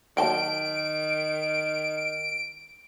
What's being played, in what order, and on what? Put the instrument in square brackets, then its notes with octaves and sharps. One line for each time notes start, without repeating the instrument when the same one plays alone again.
[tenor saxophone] D#3 [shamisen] F#3 G5 A5 [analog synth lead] D7